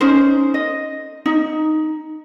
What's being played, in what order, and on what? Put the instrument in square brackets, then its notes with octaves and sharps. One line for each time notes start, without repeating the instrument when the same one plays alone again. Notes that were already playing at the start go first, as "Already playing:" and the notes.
[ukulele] C#4 D#4 C5
D#5
D#4